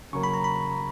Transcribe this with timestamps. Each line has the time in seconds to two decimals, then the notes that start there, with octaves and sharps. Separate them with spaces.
0.13 C#3 F#3 A#3 C#6
0.23 B5
0.34 A#5
0.44 B5